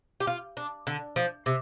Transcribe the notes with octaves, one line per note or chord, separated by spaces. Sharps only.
G4
F4
D4
D3
F3
C3